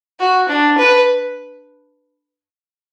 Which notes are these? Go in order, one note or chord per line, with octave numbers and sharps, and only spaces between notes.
F#4
D4
B4